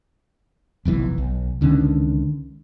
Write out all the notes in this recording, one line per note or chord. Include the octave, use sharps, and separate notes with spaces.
F1 B1 G#2 E3
B1
C#2 D3 D#3 C#4